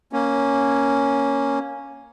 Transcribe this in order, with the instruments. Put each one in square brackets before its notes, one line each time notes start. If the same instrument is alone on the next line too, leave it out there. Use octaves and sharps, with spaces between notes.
[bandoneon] A#3 C#4